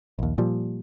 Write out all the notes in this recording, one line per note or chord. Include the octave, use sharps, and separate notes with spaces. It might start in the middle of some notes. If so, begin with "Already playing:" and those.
A#1 D#2
A#2 F3 G3